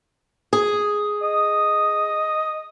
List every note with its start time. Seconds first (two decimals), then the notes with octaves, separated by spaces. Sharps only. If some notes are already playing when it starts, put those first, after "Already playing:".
0.53 G#4
1.22 D#5